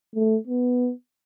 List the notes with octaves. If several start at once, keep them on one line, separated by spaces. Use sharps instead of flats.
A3
B3